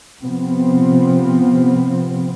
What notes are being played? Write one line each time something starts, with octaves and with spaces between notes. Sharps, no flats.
C3 F3 B3 C4